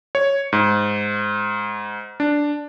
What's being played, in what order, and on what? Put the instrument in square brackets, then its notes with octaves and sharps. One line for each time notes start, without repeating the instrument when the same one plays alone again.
[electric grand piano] C#5
G#2
D4